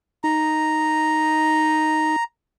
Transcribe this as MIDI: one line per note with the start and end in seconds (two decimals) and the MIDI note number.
0.24 2.16 63
0.24 2.24 82